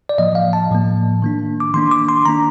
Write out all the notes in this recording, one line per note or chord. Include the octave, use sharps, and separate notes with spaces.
D5
A2 F3 A#3 D#5
F5
A5
A2 F3 A#3
D#3 A#3 D4
D6
D#3 A#3 D4 C6
D6
C6
D#3 A#3 D4 A#5